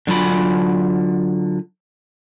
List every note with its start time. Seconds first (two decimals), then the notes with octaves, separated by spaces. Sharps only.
0.07 D3 F#3 F4 B5